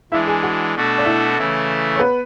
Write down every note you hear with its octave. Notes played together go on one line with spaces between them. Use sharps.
E3 G#3 D4 E4 E5
G#4 G#5
F#4 F#5
B2 A3 D4 F#4 A4
D5
E4 E5
C#3 E3 A3 E4
C#5
B3 B4